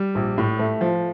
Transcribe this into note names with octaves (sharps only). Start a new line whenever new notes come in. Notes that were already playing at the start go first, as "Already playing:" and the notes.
Already playing: G3
A#1
A2
A3
F3